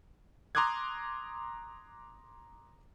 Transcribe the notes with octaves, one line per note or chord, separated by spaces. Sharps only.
A#5 C6 D6 D#6 F#6 G#6